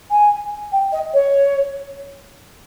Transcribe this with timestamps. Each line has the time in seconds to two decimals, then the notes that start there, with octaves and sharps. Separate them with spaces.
0.10 G#5
0.72 G5
0.92 D#5
1.14 C#5